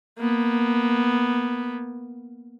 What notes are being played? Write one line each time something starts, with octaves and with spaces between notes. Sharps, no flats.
A#3 B3